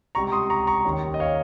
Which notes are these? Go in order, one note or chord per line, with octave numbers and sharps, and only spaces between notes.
C#2 C3 G3 A#5 C#6
C6 D#6
A#5 C#6
A#5 C#6
D#2 D#3 G3 C#4
D#5
C#5 F5